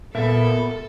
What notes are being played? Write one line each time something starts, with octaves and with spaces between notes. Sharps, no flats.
A#2 B3 A4 A#4 E5